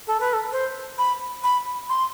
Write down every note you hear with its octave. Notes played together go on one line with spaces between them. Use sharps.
A4
B4
A4
C5
B5
B5
C6